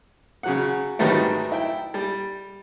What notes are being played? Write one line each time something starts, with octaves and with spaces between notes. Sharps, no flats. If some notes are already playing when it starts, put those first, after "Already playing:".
C#3 F#3 F#5
G#2 D#3 E3 F#3 G3 A3
E4 G5
G3